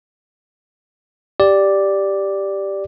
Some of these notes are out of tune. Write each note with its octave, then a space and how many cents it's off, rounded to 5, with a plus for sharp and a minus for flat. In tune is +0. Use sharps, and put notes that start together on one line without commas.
G4 +0 D5 +0